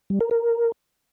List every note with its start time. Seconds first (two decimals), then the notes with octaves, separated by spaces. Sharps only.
0.10 G3
0.21 A#4
0.31 A#4